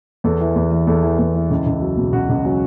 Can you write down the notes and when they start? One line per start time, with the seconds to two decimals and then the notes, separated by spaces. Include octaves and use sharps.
0.24 E2 A4
0.41 E3
0.56 E2
0.71 E3
0.87 E2 A4
1.03 E3
1.19 E2
1.34 E3
1.51 C#2
1.66 C#2
1.82 F#3
1.97 B2
2.13 C#2 F#4
2.29 C#2
2.45 F#3 C#4